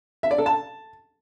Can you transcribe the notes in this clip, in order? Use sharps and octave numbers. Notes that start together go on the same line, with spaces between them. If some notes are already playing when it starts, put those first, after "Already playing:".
E5
D5
A4
A5